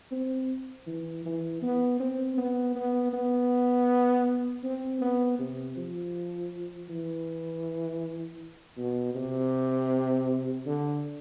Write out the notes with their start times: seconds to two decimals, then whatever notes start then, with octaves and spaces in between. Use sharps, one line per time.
0.11 C4
0.87 E3
1.25 E3
1.62 B3
2.00 C4
2.37 B3
2.75 B3
3.13 B3
4.64 C4
5.01 B3
5.39 C3
5.77 F3
6.89 E3
8.78 B2
9.15 C3
10.66 D3